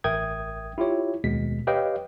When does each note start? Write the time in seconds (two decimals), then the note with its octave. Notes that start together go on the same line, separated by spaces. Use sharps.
0.04 A1 A#4 E5 G5 D#6 G#6
0.78 E4 F4 G4 C#5
1.24 D#2 B2 G#3 B6
1.67 G4 B4 C#5 D#5 F5 G5